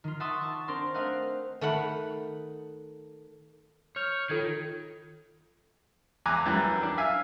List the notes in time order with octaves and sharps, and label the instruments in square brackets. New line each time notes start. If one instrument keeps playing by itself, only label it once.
[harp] D#3 F4
E5 F#5 A5 C6 C#6 D#6
A5 C#6
C4 D4 A#4 C6
A3 C4 A#4 D#5 F5 F#5
[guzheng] D#3 A3 D#4 F#5 B5
[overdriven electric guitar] C#5 [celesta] F6 G6 F7
[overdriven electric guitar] D#3 [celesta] F4 A4 G#6
[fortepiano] E2 G#5 A#5 D6 F#6
F#2 E3 G3
D4
E5 F5 G#5